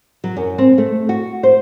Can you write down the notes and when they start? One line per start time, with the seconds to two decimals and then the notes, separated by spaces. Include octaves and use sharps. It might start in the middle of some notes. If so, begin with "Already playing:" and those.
0.24 F#3
0.37 F#2
0.58 C4
0.78 A3
1.09 F#4
1.43 C5